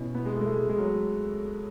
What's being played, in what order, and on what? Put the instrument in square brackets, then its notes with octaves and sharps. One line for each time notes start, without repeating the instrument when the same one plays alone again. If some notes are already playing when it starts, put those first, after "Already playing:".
Already playing: [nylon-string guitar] B2 C#4 E4
[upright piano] B3
G#3
A3
G#3
A3
G#3
G#3
F#3